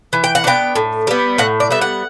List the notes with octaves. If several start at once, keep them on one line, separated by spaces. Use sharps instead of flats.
E3
G5
F#5
B3 D4 G5
A2
G3 B3
A2 F#5
D5
G3 B3 E5
F#5